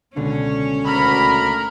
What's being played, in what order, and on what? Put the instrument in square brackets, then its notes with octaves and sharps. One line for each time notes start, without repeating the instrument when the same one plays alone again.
[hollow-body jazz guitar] C#2 B2 D3 [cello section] C#4
[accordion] D2 B5 [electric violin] A#4